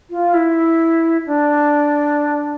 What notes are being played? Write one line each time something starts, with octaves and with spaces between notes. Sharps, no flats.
F4
E4
D4